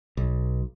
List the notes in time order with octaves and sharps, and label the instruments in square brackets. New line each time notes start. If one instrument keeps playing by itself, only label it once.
[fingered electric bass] B1